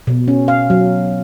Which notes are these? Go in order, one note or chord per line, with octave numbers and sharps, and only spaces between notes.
B2
C#4
F5
F#3